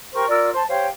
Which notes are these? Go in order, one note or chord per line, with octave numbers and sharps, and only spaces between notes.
G4 A#4 C5 C#6
F4 A#4 D5 E6
C5 A5
G4 C5 C#5 F5